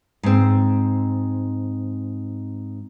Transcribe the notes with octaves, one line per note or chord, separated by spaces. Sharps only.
G#2 C4